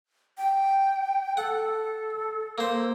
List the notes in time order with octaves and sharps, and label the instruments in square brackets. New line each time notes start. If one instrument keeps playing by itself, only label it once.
[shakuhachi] G5
[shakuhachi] A4 [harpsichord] F#5
[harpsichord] A#3 C5